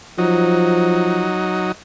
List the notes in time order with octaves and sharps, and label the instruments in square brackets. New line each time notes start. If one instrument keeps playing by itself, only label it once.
[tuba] F3 [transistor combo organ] F#3 D#4